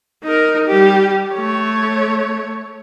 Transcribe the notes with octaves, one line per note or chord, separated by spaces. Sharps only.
D#4 A#4
G3 G4
A3 C#5